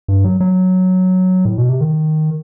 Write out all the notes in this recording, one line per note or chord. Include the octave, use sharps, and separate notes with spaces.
G2
F#3
F#3
A2
B2
C3
D#3